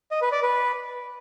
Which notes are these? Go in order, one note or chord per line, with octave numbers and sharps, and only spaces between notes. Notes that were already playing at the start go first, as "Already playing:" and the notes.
D#5
B4
D5
B4